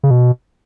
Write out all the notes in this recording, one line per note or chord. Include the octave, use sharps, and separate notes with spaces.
C#3
B2